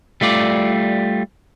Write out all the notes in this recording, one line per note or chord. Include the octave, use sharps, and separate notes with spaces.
G3 A3 F4 D5